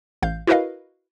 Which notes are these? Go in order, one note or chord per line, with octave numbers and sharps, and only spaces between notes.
A1 F5 G6
E4 F#4 A#4 B4 D#5 F5